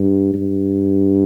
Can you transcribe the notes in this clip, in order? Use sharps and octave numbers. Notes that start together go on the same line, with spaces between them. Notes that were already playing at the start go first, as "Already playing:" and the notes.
Already playing: G2
G2